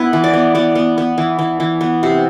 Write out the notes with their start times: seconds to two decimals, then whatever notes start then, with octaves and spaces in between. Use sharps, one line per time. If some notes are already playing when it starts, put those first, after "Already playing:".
Already playing: B3 E4 B4
0.13 E3
0.24 D5
0.33 B3
0.55 B3 D5
0.75 B3
0.98 B3
1.18 E3
1.39 E3
1.60 E3
1.81 B3
2.03 C3